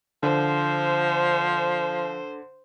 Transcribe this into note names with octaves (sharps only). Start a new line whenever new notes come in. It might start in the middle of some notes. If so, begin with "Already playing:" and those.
D3 F3 C5